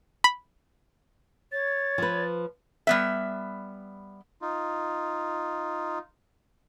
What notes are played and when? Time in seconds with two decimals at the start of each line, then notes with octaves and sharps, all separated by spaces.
0.24 B5
1.52 C#5 A6
1.98 F3 B4
2.87 G3 B3 E5
4.42 D#4 F4